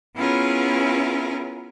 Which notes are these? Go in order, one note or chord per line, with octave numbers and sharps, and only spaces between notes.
B3 C#4 E4 F4 G#4 A#4